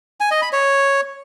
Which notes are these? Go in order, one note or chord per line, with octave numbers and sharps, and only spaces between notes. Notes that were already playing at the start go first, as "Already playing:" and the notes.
G#5
D#5
B5
C#5